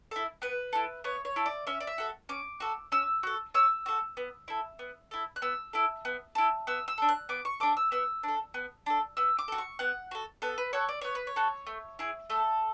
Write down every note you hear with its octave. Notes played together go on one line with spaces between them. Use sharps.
E4 A4
B3 B4
E4 A4
B3 C#5
C#5
E4 A4
D5
C#4 E5
D5
E5
F#4 A4
C#4 D6
F#4 A4
C#4 E6
F#4 A4
C#4 E6
F#4 A4
B3
E4 A4
B3
E4 A4
F#6
B3 E6
E4 A4
B3
E4 A4
B3 E6
E6
D4 A4
F#6
B3 D6
C#6
D4 A4 D6
E6
B3 E6
D4 A4
B3
D4 A4
B3 E6
D6
F#4 A4
C#6
B3 F#5
F#4 A4
B3 A4
B4
F#4 A4 C#5
D5
B3 C#5
B4
C#5
F#4 A4
A3
E4 G#4
A3 A4